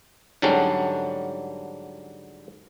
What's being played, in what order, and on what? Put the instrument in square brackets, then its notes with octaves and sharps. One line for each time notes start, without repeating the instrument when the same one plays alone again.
[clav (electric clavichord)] G#2 D3 F#3 G3 C#4 D4